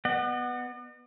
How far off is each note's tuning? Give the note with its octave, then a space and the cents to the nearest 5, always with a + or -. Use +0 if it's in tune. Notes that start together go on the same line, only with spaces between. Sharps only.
B3 +0 D#5 -45 F#5 +0